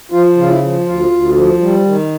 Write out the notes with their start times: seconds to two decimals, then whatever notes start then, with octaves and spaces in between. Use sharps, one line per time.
0.12 F3 F4
0.37 C#3 F4
0.49 E4
0.61 F3
0.86 D2 F4
1.10 D2
1.36 F3
1.61 G3
1.85 D#3